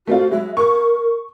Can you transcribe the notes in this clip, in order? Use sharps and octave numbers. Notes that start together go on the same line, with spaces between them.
A3 C4 F4 F#4
F#3 G#3 E5
A#4 C#6